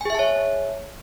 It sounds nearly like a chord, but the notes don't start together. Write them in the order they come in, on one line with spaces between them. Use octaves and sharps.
G#5 G#4 E5 A5 C#5